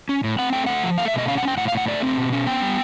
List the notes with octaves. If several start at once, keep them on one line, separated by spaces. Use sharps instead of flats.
C#4
A2
C4 F#5
A3 G5
A3 F#5
F3
A3 F5
E5
B2 D#5
C#4 F5
F#5
C#4 G5
A2 F#5
F5
A2 F#5
A3 D5
C4
B2
C#4
B3 G5
G3